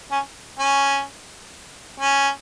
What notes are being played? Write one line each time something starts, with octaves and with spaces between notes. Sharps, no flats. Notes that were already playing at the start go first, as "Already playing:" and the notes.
C#4
C#4
C#4